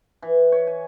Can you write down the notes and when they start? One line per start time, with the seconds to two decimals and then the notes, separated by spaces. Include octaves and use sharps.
0.22 E3
0.52 C#5
0.67 G#5